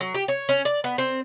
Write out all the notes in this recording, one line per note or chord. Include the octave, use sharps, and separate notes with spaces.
F#3
G4
C#5
C#4
D5
B3
C4